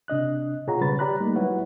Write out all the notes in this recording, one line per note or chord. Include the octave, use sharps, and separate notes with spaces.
C3 D4 D#5 F#6
B2 F4 G#4 C#5 F#5 A#5
C#3 G3 B4 C#5 B5 A6
G4 D5 A#5 B5 F#6
G3 A3 A#3 D#4
F#3 G3 E4 B4 C#5 F#5